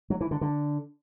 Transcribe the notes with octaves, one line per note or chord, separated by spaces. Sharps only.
F#3
E3
D3
D3